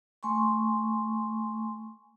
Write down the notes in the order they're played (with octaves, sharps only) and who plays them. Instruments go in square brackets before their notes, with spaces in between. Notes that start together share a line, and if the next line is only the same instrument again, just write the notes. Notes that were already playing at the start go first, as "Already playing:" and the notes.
[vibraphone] A3 G#5 C6 C#6